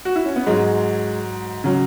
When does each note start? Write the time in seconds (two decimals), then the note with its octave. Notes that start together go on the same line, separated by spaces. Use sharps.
0.05 F#4
0.16 E4
0.25 C#4
0.36 B3
0.47 G#2 F#3 G#3
1.64 C#3 F#3